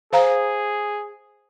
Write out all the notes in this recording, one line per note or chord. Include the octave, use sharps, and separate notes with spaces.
G#4 C5 F5 A#5